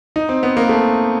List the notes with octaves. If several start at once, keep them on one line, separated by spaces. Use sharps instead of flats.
D#4
C4
B3
A#3
A3